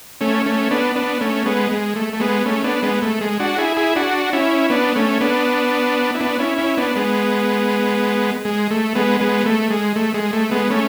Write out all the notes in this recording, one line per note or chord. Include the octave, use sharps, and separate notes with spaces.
A3 C#4
A3 C#4
B3 D4
B3 D4
A3 C#4
G#3 B3
G#3
A3
A3
G#3 B3
A3 C#4
B3 D4
G#3 B3
A3
G#3
D4 F#4
E4 G#4
E4 G#4
D4 F#4
C#4 E4
B3 D4
A3 C#4
B3 D4
E4
B3 D4
C#4 E4
C#4 E4
B3 D4
G#3 B3
G#3
A3
G#3 B3
G#3 B3
A3
G#3
A3
G#3
A3
G#3 B3
A3 C#4